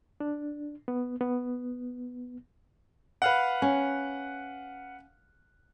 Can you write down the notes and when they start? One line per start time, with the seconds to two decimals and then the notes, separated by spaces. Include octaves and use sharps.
0.20 D4
0.88 B3
1.21 B3
3.22 B4 F5 F#5
3.62 C#4